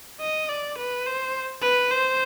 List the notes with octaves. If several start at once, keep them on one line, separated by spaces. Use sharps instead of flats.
D#5
D5
B4
C5
B4
C5